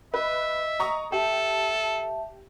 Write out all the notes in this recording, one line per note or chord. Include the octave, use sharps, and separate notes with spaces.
B4 D#5 E5
A#5 C#6 D#6
G4 A4 E5 A5